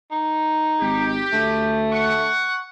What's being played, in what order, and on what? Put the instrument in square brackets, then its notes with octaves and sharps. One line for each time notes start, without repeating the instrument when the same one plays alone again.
[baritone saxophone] D#4
[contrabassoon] G#1 [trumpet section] G4
[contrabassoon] D2 [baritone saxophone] A3
[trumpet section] F#5 C#6